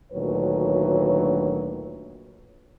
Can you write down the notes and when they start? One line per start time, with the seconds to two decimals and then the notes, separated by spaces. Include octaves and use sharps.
0.12 D2 A#2 D#3 F#3 B4 C#5